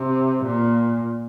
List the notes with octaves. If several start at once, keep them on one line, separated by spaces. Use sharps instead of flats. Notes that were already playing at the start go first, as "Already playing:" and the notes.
Already playing: C3
A#2